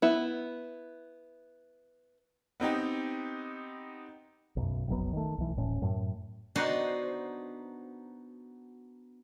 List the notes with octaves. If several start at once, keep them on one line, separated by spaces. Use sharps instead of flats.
B3 E4
B3 C4 D#4 G4
B1 F#2
F1 A#1 F#3 B3
D#3 A3
B1 E3
D1 A2 C#4
F#2 A2
B3 D4 D#4 F#4 C5